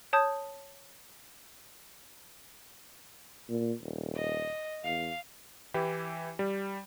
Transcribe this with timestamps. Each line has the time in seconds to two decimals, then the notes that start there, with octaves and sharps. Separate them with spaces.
0.13 C#5 A5 D#6 G6
3.49 A#2
3.82 D#1
4.15 D#5
4.84 E2 F5
5.74 E3 E4 G4
6.39 G3